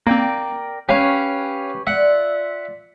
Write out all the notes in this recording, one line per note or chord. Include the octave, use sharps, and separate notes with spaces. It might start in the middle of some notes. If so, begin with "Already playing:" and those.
A#3 C4 A#4 D5 G5
C#4 G4 B4 C#5 F5 G#5
F4 D5 E5 F#5